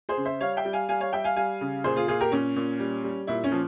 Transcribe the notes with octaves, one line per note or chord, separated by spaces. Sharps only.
G#4 C5
C#3
C5 E5
G3 C#5 F5
E5 G5
G3
F5 G#5
G3 F5 G#5
C#5 F5
G3 E5 G5
F5 G#5
G3 F5 G#5
C#3
A#2 G#4 C5
F4 G#4
A#2 F4 G#4
G4 A#4
A#2 C#4
A#2
G3
G3
A#2 E4
C#4
F3